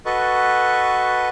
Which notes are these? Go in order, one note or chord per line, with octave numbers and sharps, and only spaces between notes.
F#4 A4 B4 D#5 C#6